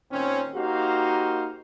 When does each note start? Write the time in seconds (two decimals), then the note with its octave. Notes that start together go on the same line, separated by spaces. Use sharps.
0.12 A#2 D#3 C4 C#4
0.56 A#3 D#4 F#4 G4 C5 F5